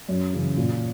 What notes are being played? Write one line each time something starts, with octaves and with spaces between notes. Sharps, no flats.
F#2
C#3 E3
A#2